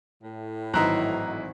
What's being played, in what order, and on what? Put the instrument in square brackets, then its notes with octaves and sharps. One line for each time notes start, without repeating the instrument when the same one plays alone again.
[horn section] A2
[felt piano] G#1 E3 F#3 [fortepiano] D#4 E4 C5 [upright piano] A#5 F#6